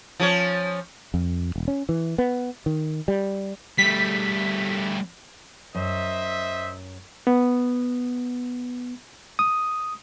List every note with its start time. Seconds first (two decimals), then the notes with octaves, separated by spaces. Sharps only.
0.20 F3 C#4 C#5
1.14 F2
1.56 E1
1.68 C#4
1.89 E3
2.18 B3
2.66 D#3
3.08 G3
3.78 G3 A3 B6
5.75 F#2 C5 D#5 E5
7.27 B3
9.39 D#6